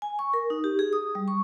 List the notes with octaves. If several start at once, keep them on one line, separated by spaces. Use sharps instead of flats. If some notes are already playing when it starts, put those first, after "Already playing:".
G#5
C#6
A#4
D#4
G4
G#4
D#6
G3
C#6